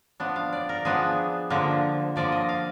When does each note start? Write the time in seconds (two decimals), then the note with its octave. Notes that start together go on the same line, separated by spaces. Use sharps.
0.20 F3 B3 D4
0.36 F5
0.53 D5
0.69 A#4
0.85 F3 B3 D4 G#4
1.50 D3 F3 A#3
2.16 D3 F3 A#3 D5
2.32 D#5
2.49 F5